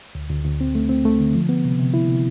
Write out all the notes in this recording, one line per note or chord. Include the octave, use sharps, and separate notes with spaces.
D2
D2
D2
C4
A3
C4
A3
D3
F3
B3
C3
C3
E4
C3